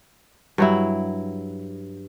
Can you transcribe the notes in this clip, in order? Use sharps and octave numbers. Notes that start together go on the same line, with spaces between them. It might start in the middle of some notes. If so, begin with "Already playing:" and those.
G2 F#3 E4